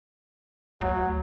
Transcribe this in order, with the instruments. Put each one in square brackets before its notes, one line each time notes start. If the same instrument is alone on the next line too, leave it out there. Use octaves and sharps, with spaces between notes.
[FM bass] D2 [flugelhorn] F#3